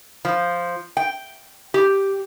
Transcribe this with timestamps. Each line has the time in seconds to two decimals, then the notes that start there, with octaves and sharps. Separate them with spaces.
0.25 F3
0.97 G5
1.74 G4